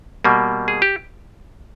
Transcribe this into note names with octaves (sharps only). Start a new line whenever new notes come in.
B2 G3 A#3
G#4
G4